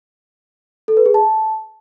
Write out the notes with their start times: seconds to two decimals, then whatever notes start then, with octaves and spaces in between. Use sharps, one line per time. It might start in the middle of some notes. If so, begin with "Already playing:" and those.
0.88 A4
0.97 B4
1.06 G#4
1.14 A5